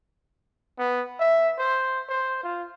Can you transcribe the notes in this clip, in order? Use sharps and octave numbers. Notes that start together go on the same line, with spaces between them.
B3
E5
C5
C5
F4